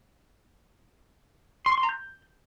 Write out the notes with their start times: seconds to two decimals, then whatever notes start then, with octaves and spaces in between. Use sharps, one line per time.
1.66 C6
1.72 C#6
1.78 C6
1.83 A#5
1.89 G6